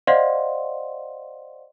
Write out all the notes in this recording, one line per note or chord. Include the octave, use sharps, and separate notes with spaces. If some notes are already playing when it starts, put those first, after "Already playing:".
C5 D5 D#5 F5 F#5 C6